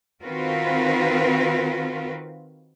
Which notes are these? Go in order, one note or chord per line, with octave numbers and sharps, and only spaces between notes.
D#3 C4 F4 F#4 A#4 B4